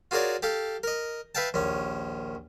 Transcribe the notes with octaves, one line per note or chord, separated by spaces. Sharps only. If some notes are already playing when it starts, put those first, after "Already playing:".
F4 F#4 G#4 A#4 C#5 D5
G4 A4 F5
A#4 D#5
B4 E5 F5 G5 A5
A#1 D#2 C#4